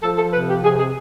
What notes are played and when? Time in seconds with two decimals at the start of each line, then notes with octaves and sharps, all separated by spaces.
0.02 F3 A4
0.17 A4
0.32 C3 B4
0.48 G4
0.63 C3 G#4
0.78 G#4